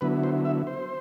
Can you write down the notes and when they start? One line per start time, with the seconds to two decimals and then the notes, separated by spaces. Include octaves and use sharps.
0.01 D3 F#3 B3 E4 B4
0.23 C5
0.45 E5
0.67 C5